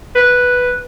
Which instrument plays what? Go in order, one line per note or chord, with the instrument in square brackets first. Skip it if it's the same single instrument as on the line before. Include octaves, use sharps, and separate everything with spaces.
[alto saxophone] B4